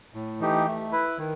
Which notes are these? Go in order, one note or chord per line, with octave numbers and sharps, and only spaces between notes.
A2
E3 A3 D#4 G4
A3
E4 B4
D#3